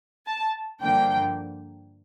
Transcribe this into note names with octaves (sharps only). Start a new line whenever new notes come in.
A5
G2 D3 F3 A#3 G5